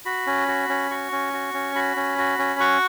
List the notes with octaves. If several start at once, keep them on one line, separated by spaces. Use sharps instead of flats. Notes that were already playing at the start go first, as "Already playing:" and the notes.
F#4 B5
C#4
F#4
C#4
F#4 C#6
C#4
F#4
C#4
F#4 B5
C#4
F#4
C#4
F#4 C#6